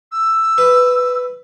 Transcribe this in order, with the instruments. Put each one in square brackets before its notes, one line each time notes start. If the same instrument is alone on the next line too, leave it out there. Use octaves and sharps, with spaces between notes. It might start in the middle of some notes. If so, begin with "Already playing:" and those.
[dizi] E6
[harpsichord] B4